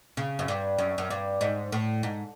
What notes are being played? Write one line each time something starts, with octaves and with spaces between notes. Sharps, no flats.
C#3
F#2
G2
F#2
F#2
G2
G#2
A2
G#2